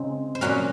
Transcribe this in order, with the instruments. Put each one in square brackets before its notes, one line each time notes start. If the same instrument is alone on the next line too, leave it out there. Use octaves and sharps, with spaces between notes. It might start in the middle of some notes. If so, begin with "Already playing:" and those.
Already playing: [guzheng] C#3 G#3 C4 D#4
C5
A#2 F#3 C#4 F#4 A#4